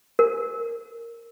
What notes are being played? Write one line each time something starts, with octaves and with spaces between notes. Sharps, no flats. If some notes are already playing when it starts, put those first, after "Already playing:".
A#4